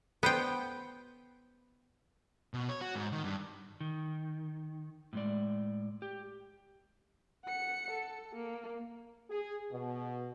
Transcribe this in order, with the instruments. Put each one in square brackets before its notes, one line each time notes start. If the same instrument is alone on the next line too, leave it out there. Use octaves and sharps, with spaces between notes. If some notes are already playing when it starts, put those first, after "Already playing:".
[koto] B3 C5 G5
[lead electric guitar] B2
C#5
F#4
G#2
D#3
G2
[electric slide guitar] D#3
A2 G#3 D5
G4
[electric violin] F#5 C#7
A4
A#3
[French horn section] G#4
B2